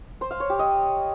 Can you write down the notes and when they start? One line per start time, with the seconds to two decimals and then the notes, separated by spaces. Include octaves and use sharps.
0.21 C5
0.31 F5
0.40 C#5
0.50 G4
0.59 D#5